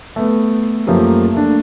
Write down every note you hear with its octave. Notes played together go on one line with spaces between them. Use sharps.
A3 B3
F#2 F3 A3 A#3 G4
A3 A#3 D4